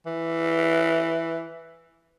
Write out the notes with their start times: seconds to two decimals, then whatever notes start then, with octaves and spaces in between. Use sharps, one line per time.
0.06 E3